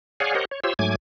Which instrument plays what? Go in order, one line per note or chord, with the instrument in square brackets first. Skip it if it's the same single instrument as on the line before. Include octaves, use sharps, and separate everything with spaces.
[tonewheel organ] G#4 C#5 D5 F5 F#5 G#5
G4 A#4 C5 C#5 D#5 F#5
C#5
F4 G4 C5 C#5 E6
G#2 F#3 A3 G#5 D6 G#6